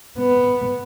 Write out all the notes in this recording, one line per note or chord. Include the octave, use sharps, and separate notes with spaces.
B3